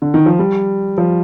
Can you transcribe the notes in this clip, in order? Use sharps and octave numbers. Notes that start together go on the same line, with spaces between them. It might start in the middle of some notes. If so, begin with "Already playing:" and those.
D3
D#3
F3
G3
F3